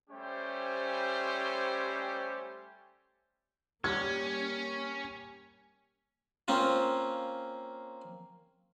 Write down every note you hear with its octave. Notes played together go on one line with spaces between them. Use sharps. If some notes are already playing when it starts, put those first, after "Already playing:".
G3 A3 C#4 G4 C5 G#5
G3 A#3 C#4 G#6
A#3 C4 C#4 F4